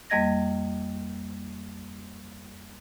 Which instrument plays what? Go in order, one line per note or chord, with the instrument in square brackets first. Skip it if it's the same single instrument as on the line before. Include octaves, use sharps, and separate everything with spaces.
[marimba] F2 G3 A#3 D#5 G#6 A#6